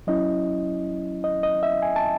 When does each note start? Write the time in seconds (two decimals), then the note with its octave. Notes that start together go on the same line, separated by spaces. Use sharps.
0.07 F#3 C#4 E4 D#5
1.24 D#5
1.43 D#5
1.63 E5
1.82 G#5
1.96 A5